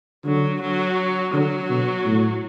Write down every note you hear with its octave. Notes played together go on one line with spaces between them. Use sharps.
D3 F#3
F#3
D3 F#3
B2
A2